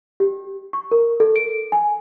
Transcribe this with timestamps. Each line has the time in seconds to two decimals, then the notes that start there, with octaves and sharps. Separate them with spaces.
0.20 G4
0.73 C#6
0.91 A#4
1.20 A4
1.36 D7
1.72 G#5